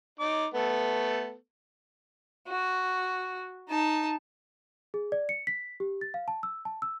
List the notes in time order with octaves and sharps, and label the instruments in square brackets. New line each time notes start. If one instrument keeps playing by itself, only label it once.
[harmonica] D#4 D6
A3 B3 A4
[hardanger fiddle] F#4
D#4 A5
[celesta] G#4
D5
C#7
B6
G4
A6
F5
A5
E6
A5
E6